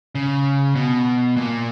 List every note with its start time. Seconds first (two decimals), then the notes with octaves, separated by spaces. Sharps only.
0.15 C#3
0.75 B2
1.37 A#2